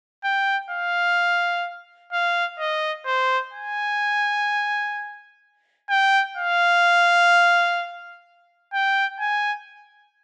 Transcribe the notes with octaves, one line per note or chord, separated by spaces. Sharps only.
G5
F5
F5
D#5
C5
G#5
G5
F5
G5
G#5